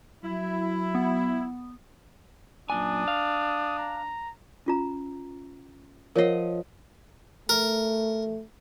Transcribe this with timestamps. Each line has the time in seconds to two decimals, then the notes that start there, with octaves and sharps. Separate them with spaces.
0.24 F#3 E4
0.95 B3
2.70 F#2 A#2 D4 G#5 D#6
3.08 F5
3.78 A#5
4.66 C#4 F4 A#5
6.16 F3 A#4 C#5 D#5 F#5
7.49 A3 A#4